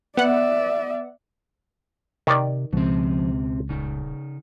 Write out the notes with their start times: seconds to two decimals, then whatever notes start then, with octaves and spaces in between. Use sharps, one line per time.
0.17 B3 D5 E5 F#5
2.27 C3 D#3 D5
2.73 C#2 B2 F3 C4
3.69 D#1 C#3 D#4